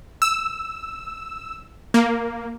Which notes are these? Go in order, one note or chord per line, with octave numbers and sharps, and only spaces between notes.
E6
A#3